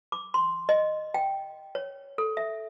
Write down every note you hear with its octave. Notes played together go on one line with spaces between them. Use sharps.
D6
C6
D#5
G5
C#5
A4
E5